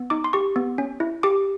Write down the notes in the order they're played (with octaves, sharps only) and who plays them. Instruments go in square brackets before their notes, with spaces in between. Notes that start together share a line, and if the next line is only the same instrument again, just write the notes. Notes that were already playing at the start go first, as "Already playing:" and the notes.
Already playing: [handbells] B3
D#4 D6
C6
G4 C#6
B3
C#4
E4
G4 D6